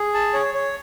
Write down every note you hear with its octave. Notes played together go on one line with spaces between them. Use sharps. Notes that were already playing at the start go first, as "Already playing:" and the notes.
Already playing: G#4
A5
C#5
C#5